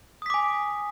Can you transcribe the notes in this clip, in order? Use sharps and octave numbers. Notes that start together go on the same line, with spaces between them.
G#5 D6 D#6 B6